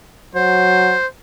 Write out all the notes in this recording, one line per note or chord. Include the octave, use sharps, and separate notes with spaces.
F#3 C5